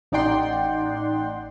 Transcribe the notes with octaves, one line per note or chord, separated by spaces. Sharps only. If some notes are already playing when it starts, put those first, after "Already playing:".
A1 D#4 D5 F#5 G5 C6